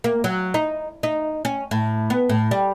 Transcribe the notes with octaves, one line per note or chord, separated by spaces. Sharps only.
A#3
F#3
D#4
D#4
C#4
A2
B3
A2
G3